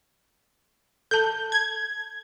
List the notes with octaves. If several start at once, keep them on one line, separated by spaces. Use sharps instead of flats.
A4 A5 G6
G#6